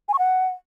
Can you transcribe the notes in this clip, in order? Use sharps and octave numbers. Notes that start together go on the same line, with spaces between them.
G#5
C#6
F#5